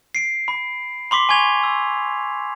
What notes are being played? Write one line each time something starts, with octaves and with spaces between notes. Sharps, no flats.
C7 D7
B5
B5 C6 D6 B6
G#5 C#6 G#6 F7
E6